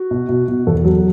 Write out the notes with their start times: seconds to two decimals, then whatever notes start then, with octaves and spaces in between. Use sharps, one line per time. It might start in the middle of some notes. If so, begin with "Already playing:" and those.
Already playing: F#4
0.11 B2
0.29 B2
0.48 B2
0.67 E2 A4
0.84 F#3